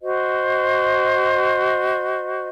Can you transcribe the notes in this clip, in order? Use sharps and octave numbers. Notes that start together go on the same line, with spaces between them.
F#4 C5 D#5